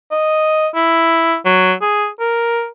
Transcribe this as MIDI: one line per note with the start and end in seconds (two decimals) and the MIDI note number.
0.11 0.67 75
0.75 1.36 64
1.45 1.73 54
1.82 2.08 68
2.20 2.67 70